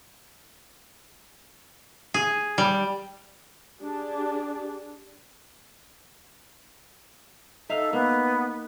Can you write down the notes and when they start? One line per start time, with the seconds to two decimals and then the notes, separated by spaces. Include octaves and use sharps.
2.14 G#4
2.58 G3
3.79 D4 G4 G#4
7.69 D#4 A4 E5 F5
7.93 A#3 B3